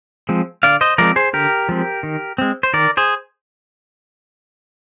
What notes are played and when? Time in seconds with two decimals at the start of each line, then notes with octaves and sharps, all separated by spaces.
0.29 F3 G#3 C4
0.63 D3 D5 F5
0.81 C5 D#5
0.98 F3 G#3 C4 A#4 D5
1.16 G#4 C5
1.33 D3 G4 A#4
1.69 F3 G#3 C4
2.03 D#3
2.38 G#3 C4
2.63 C5
2.74 D#3 A#4 D5
2.97 G#4 C5